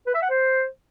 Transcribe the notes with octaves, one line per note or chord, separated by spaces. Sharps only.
B4
E5
F#5
C5